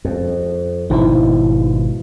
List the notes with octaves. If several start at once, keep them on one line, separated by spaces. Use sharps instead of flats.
F2
G#1 B2 F3 D#4 E4